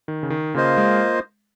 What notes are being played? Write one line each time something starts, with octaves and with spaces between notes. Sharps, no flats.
D#3
C#3
D#3
C#3 A#3 F4 C5 D#5
G#3